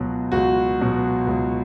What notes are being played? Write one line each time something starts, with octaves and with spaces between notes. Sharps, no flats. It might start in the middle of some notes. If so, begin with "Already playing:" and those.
Already playing: C#2 B2 F#3
C#2 F#4
B2 F#3
C#2